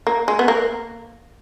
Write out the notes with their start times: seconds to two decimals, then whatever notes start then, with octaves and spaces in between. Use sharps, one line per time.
0.07 A#3
0.28 G#3
0.39 B3
0.48 A#3